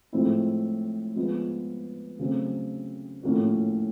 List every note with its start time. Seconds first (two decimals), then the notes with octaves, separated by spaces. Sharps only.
0.13 A2 F3 G#3 C4 E4
1.16 F3 G#3 B3
2.19 C#3 F#3 A3 C4
3.23 A2 F3 A#3 C#4 F#4